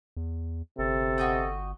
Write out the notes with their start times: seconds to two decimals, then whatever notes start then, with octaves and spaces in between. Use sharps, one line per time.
0.17 E2
0.79 G1 C3 A4
1.18 F#4 D#5 G5